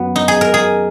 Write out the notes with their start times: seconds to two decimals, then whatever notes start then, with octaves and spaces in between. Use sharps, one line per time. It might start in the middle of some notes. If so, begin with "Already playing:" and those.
Already playing: F#2 F#3 B3
0.16 D#4
0.28 G#4
0.41 A#4
0.54 G#4